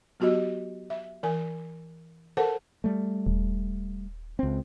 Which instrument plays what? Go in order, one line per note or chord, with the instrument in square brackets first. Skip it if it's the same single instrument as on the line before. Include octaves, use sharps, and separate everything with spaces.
[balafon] F#3 B3 F#4 G4 D#5
E5
E3 A#4 G#5
A4 A#4 C5 F#5 A5
[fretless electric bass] G3 A3
[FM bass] D#1
[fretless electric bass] C#2 C4